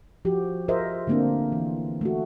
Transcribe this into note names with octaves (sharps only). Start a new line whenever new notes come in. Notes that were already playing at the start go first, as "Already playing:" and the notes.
F3 F#4 G4
F4 G#4 A#4 C5 D#5 E5
D3 A3 A#3 C4 D4
E3
A3 F#4